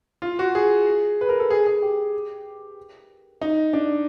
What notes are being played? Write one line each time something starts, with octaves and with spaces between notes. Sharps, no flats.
F4
F#4
G#4
B4
A#4
A4
G#4
G#4
G4
D#4
D4